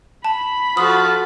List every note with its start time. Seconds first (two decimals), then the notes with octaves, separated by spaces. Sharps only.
0.24 A5 B5
0.77 F3 F4 F#4 A4 D#6